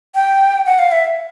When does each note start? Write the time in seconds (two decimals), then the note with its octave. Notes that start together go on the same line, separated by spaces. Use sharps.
0.15 G5
0.66 F#5
0.79 F5
0.92 E5